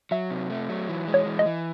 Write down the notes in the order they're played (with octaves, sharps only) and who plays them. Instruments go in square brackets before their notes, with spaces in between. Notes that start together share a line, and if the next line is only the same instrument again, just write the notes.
[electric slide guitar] F#3 [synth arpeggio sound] E5
[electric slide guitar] C3
A3
F#3
E3
G#3
[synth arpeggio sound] C#5
[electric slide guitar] E3
[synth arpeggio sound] D#5
[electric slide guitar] E3